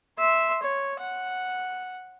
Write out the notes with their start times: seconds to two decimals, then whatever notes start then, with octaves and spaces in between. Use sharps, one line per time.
0.19 E5 C6
0.63 C#5
1.00 F#5